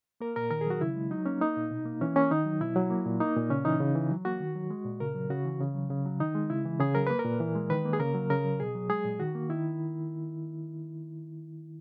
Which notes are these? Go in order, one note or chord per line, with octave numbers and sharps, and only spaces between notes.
A#3 A#4
A#2 A#4
D#3 A#4
G#4
F#3 F#4
C#3 E4
G#3
F#3 D#4
A#3 C#4
A#3 D#4
A#2
B2
A#3
E3 C#4
A#3 C#4
D#3 D#4
F#3
B2 E4
F#3
A#3
A#2
A#3 D#4
A#2
C#3 C#4
E3 D#4
C#3
E3
F#3
A#3 F#4
D#3
F#3
G#3
A#2
C#3 A#4
F#3
C#3 F#4
E3
C#3
F#3
C#3
F#3
D#3 D#4
G#3
C#3 E4
E3
C#3 G#4
F#3 A#4
A#3 B4
A#4
A#2
E3
G#3
D#3 B4
A#3
G#4
C#3 A#4
F#3
C#3 A#4
F#3
B2 G#4
F#3
G#3 G#4
A#2
D#3 F#4
A#3
D#3 E4